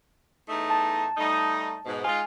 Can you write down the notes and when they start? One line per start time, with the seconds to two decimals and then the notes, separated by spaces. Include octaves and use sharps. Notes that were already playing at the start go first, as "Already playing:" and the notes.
0.49 E2 A3 D#4
0.70 A5
1.17 G3 A3 D#4
1.86 G#2 B2
2.05 G#3 D#4 F4 G#5